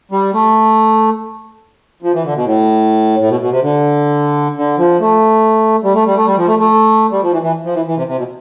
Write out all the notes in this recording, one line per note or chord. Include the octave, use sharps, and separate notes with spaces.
G3
A3
F3
E3
D3
B2
A2
A2
B2
B2
C3
D3
D3
F3
A3
G3
A3
G3
A3
G3
F3
A3
A3
G3
F3
E3
E3
F3
E3
E3
C3
C3
B2